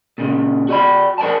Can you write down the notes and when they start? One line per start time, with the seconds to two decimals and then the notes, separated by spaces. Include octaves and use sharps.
0.18 A#2 C#3
0.68 F#4 D5 B5
1.18 A#4 D5 G#5 A5